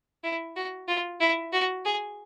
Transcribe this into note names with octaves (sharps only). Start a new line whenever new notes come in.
E4
F#4
F4
E4
F#4
G#4